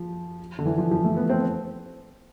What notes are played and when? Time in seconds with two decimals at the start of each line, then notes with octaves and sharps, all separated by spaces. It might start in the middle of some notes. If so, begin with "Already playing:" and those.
Already playing: F3
0.59 D3
0.65 E3
0.78 F3
0.91 F3
1.04 A3
1.17 B3
1.30 C4